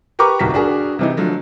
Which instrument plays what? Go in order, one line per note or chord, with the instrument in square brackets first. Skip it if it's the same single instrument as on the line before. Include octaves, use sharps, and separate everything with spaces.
[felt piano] G4 A#4 B4 A#5 C#6 D6
D#1 C2 D#3 F#4 A#5 B6
D4 F#4 G#4 A#4
C3 E3 D#4
D3 F3 F#3 A3